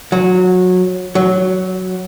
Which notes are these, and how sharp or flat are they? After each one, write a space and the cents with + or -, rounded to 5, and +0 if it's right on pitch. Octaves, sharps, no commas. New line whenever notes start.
F#3 -20
F#3 +5